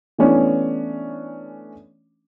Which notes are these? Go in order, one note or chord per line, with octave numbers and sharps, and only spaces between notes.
E3 A3 B3 C#4 D4